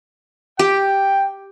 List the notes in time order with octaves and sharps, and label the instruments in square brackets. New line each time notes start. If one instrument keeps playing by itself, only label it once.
[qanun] G4 [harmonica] G5